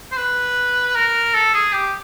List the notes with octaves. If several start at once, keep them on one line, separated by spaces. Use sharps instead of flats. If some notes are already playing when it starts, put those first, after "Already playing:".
C5
B4
A#4
A4
G#4
G4